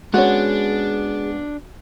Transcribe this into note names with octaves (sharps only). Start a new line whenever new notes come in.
G#3 B3 C#4 D4 F#4 G#4 C#5